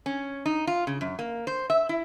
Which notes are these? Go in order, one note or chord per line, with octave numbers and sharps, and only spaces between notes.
C#4
D#4
F4
C#3
F#2
A#3
C5
E5
E4